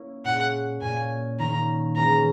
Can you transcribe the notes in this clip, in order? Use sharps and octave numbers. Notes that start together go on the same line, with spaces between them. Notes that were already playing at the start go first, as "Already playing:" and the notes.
Already playing: A#3 C#4 E4 A#4
A#2 G#3 C#4 E4 F#5
A#2 A#3 C#4 G#5
D#3 A#3 C#4 A#5
E3 G#3 C#4 F#4 B4 A#5